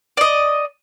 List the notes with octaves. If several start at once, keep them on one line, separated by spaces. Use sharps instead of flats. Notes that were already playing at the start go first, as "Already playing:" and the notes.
D5 D#5